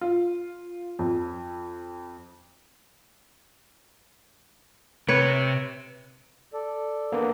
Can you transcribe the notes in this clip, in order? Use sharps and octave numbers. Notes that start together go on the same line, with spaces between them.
F4
F2
C3 B4 C#5
A4 D5
A#3 B3 D4